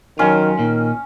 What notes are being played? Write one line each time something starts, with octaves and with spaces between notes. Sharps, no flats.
D#3 F#3 C#4 F4
A#2 D#3 D#4